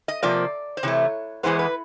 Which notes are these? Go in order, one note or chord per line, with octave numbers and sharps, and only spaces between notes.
D#5
C3 F3 A#3 D5
C5
C3 E3 A3 C#5
E2 C3 E3 G#3 B3 C5
B4